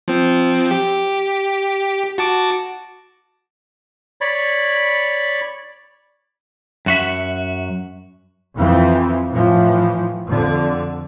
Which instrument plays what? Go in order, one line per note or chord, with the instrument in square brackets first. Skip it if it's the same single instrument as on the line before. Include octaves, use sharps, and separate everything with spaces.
[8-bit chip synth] F3 C4
G4
F#4 A5 D6
[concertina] C#5 D5 B5
[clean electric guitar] F#2 F#4 E5
[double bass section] F2 E3 F3 C4
A2 E3 F3
F2 D3